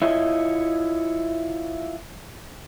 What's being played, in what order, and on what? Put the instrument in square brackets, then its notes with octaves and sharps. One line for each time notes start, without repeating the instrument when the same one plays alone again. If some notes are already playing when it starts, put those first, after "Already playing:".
[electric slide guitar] E4 F4 C#5 D#5 E5